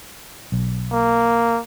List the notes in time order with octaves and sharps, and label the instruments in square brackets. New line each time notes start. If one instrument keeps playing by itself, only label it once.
[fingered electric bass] B1
[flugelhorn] A#3